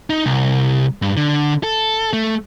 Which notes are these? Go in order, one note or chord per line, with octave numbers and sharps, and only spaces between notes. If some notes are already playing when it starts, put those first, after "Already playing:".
D#4
C2
G2
D3
A4
A3